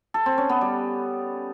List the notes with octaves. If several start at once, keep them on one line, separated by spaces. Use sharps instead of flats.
A4
C4
C#4
B3
G3